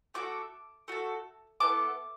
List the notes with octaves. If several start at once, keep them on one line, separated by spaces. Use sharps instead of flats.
A3 F#4 A4 D6
A3 F#4 A4
B3 E4 A4 D6